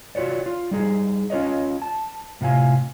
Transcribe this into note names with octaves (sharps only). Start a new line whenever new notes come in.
F4 F#4 C#5 D5
F4
G3 D#4 G#4
C#4 F4 B4 C#5 D#5
A5
A2 C3 F4 F5 G#5